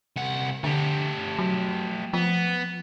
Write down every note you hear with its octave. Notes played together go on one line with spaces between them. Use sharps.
C2 F#5
D3 A3 G4
F#3
F3 B3